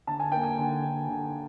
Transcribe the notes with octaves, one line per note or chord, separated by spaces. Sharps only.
D3 A5
G#5
A#3 G5
G#5
D3
D3
D3